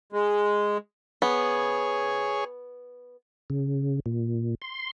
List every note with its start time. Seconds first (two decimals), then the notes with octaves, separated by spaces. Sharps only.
0.13 G#3
1.22 B3 G#4 C#5
3.50 C#3
4.06 A#2
4.62 C6